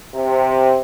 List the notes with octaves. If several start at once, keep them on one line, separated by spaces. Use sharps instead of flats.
C3